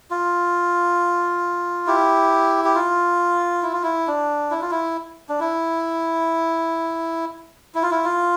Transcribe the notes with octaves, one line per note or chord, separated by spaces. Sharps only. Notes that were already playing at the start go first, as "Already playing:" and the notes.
F4
E4 G4
G4
F4
E4
F4
E4
D4
E4
F4
E4
D4
E4
E4
F4
E4
F4